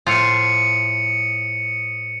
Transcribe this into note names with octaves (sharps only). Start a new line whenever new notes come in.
A2 F3 F4 D#6 C#7 D#7